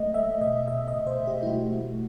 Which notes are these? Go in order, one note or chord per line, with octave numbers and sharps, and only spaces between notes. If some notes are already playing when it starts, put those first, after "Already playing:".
Already playing: A3 D#5
A3 E5
B2 D#5
B2 E5
D#5
B2
C5
B2
G4
E4
A3 F#4
A3